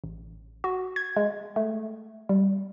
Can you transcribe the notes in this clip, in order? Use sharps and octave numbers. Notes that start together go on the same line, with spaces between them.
A1
F#4
G#6
G#3
A3
G3